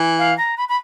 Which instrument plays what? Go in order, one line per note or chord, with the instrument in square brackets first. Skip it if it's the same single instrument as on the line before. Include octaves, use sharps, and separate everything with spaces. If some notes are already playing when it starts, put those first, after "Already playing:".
Already playing: [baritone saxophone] E3
[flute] F5
A#5
B5
B5